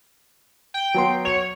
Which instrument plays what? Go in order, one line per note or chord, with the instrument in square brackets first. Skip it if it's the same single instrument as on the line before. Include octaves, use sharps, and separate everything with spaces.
[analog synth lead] G5
[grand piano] F#3 B3 C6
[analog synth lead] C#5 [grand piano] F7